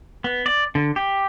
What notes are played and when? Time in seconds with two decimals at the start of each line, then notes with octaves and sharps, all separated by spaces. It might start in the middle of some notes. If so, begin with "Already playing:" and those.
0.24 B3
0.46 D5
0.75 D3
0.96 G4